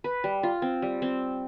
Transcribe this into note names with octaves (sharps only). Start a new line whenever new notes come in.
B4
G3
F4
C4
G3
C4